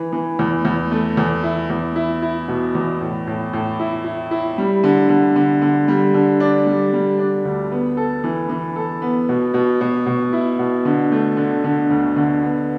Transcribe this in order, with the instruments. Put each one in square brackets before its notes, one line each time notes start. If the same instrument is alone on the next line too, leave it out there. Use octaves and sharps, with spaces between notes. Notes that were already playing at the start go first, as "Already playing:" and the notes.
Already playing: [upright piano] E3
E3
E2
E2
A3
E2
E4
E2
E4
E4
B2
E2
A2
A2
A2
E4
E4
E4
G3
D3
D3
D3
D3
G3
D3
D4
G3
G3
D4
D2
B3
A4
E3
E3
A4
B3
B2
B2
B2
B2
E4
B2
D3
A3
D3
D3
D2
D3
B3